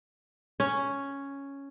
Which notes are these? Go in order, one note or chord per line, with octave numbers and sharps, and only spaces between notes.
C#4